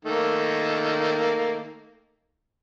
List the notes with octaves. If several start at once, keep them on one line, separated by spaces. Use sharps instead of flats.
D#3 A3 A#3